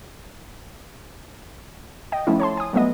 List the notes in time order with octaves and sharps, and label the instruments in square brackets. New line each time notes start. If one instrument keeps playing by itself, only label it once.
[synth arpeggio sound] D#5 G5
F3 A3 C#4 E4
C#5 A5 C6
G#5 D#6
F#3 G3 A3 B3 D#5